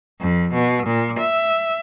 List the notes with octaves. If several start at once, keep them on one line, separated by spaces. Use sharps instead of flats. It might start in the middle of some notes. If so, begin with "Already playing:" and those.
F2
B2
A#2
E5